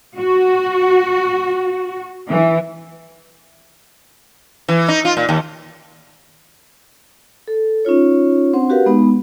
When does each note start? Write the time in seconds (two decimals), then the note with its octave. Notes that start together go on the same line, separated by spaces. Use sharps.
0.17 F#4
2.29 E3
4.68 E3
4.88 D#4
5.05 F4
5.17 A#2
5.29 D#2
7.48 A4
7.85 C#4 D#4 F4 C#5
8.53 C4 D4 C5 F#5
8.70 F#4 G4 A#4 B4 F5 F#5
8.86 G#3 B3 D#4